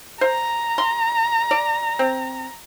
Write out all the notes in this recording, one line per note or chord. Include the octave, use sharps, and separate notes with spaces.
C5 A#5
C6
D5
C4